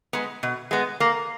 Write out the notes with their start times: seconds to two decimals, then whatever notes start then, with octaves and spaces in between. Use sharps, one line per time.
0.13 G#3 B3
0.43 B2
0.71 G#3 B3
1.00 A#3